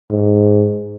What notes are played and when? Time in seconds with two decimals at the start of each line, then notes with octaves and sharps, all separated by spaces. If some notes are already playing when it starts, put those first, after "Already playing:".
0.11 G#2